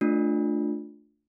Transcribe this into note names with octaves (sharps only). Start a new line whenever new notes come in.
A3 D4 F4